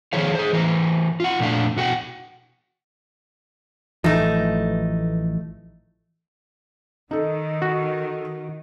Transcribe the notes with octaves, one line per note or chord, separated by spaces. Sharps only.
D#3 F3 G#4 C5 C#5 F5
G#4 C5
E3 A#4 C5
F4 F#5
F2 A#2 A3 C4 D4 F5
B2 F#4 F#5 G5
A1 E3 F3 A3 D#4
D#3 D#4 A4
F#4